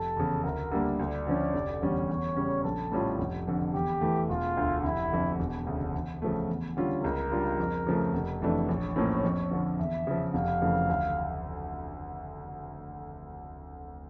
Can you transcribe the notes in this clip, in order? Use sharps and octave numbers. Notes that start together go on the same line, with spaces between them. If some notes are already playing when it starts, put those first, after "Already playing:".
Already playing: F1 A4
E2 C#3
D2 A#4
D3 G3 A#3
D2 D5
D3 F3 C#4
F1
E2 D3 G3 C#4
E2 C#5
C#3 G3 C#4
A#1 A4
A2 G3 C#4 F4
F1
F2 D3
E2 G4
E3 A3
E1 F4
D2 D3
F1 E4
F2 D3
E1
D2 C#3
E2
C#3 F3 A3
E2
D3 G3 C#4 F4
C#2 A#4
C#3 G3 D4 F4
F2
C#3 F3 A3
F1
F2 E3 A3 D4
A#1 C#5
A2 F3 A#3 C#4
F2
D3 F3
E2 E5
C#3 F3
F1 F5
F2 C#3 E3 A3
D2